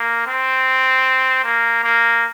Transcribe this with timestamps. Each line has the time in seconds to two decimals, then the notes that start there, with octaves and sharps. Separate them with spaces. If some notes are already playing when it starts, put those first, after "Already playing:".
Already playing: A#3
0.26 C4
1.44 A#3
1.83 A#3